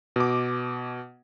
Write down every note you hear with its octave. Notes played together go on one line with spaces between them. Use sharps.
B2 D6